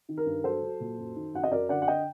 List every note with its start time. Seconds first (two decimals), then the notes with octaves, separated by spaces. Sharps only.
0.09 D#3
0.17 A#4
0.26 G2
0.44 F#3 A4 C5
0.62 F#3
0.80 A#2
0.98 F#2
1.16 D#3
1.34 F#2 F#5
1.44 D#5
1.51 F#2 A#4 D5
1.69 D3 D5 F#5
1.82 F#5
1.88 D#5 G5